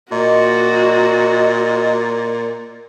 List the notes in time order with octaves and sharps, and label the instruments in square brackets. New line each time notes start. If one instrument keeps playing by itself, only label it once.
[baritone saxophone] A#2 [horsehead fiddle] F#4 [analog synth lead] D#5